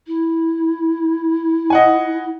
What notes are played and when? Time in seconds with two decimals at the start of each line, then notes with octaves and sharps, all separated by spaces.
0.07 E4
1.70 D#5 F#5 G#5